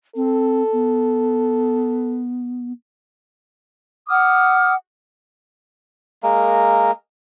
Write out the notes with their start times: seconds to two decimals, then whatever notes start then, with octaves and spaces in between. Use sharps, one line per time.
0.16 C4 A4
0.73 B3
4.08 F#5 D6 D#6 F6
6.23 G#3 A#3 A#4